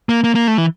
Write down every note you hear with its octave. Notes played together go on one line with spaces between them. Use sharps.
A#3
A#3
A#3
A3
E3